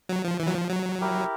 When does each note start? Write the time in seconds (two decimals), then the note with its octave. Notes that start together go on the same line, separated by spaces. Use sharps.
0.09 F#3
0.25 F3
0.40 E3
0.47 F#3
0.55 F3
0.70 F#3
1.01 E4 G4 A#4